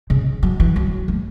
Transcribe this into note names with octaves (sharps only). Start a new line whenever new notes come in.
C#3
F#3
E3
F#3
A3